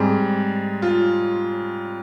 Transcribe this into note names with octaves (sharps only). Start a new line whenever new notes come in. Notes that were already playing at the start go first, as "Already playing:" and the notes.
Already playing: G#2 G3 C4 G#4
F4